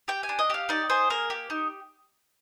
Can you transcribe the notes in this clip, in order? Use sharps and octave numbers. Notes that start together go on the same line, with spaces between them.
G4 G5
G#5
D4
D#5
G4 F5
D#4 D5
G#4 C5
A#3 A#4
G4
D#4